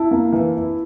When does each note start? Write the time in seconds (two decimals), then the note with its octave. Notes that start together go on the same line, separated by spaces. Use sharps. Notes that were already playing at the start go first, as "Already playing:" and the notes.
Already playing: E4 A5
0.11 A#3
0.33 E3
0.56 E4